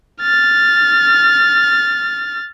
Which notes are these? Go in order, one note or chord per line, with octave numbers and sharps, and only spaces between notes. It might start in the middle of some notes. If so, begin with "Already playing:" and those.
F6 A6